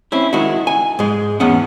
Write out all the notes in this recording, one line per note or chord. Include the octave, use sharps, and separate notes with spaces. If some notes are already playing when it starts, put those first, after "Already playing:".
C4 C#4 E4
D#3 G#3 E4 F#4
G#5
G#2 G#3
E2 B3 C#4 F#5